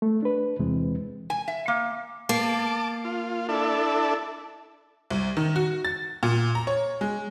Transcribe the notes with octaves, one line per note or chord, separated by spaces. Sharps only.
A3
D4 B4
E2 C3 E3 G#3 C4
G#5
E5
A#3
A#3 A5 D6
F4
D4 E4 A4
C2
D#3
F#4
A6
A#2
A#5
C#5
G#3